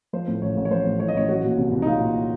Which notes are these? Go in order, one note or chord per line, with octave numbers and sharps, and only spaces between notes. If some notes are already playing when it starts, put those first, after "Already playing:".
F3 C5
A2
A1 C#5
A1
C#5
F3 C5
A2
A1 C#5
D#5
A1 C#5
F#3 F#4
A#2
C2
C2
D#4
F#3 F4
A#2